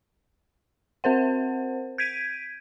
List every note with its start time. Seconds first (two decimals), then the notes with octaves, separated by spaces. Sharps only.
1.04 C4 A#4 C5 F#5
1.98 G6 G#6 B6 D7 D#7